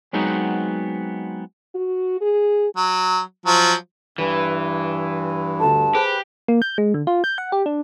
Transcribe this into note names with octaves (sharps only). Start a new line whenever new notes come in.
F#3 G#3 B3 C4 D#4 F#4
F#4
G#4
F#3
F3 F#3
G2 E3 B4
D2 A4 A5
G4 G#4 B4 C5
A#3
G6
G#3
D3
F4
G6
F#5
G4
D4